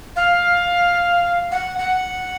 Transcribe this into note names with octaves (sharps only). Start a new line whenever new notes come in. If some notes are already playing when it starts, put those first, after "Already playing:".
F5
F#5
F#5